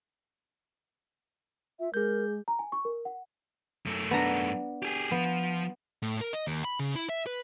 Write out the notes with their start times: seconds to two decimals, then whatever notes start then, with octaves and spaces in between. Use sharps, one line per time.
1.80 F4 E5
1.94 G#3 G#4 A#4 G6
2.48 A#5
2.59 G#5
2.72 C#6
2.85 A#4
3.05 F#5
3.86 F#2 A3
4.11 B3 D4 A#5
4.83 G4 G#4
5.11 F3 B3
6.02 A2
6.21 A#4
6.33 D#5
6.47 D#2
6.64 B5
6.79 C#3
6.95 E4
7.09 E5
7.26 B4